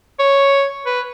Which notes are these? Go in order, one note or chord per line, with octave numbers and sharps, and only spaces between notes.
C#5
B4